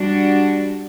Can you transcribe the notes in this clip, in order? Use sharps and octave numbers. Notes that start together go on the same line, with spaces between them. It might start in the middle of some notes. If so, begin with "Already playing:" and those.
Already playing: G3 D4 F#4